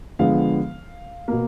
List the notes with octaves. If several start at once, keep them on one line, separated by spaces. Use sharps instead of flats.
D3 F3 G#3 B3 F5
B2 A#3